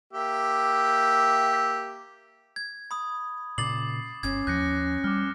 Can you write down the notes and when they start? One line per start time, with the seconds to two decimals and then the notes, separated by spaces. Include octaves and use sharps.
0.13 A#3 G4 E5
2.56 G#6
2.91 B5 D#6
3.58 A#2 C#3 D6 A6 C7 F#7
4.23 G1 C#4 G#6
4.47 D#2 F3 F#6 G6 A#6 C#7
5.04 G3 D6 F6